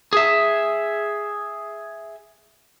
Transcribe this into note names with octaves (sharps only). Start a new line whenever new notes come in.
G#4 E5